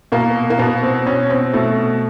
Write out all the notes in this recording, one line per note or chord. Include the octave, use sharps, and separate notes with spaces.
B2 A#3
A#3
B2 B3
C4
B2 C#4
C4
B2 A3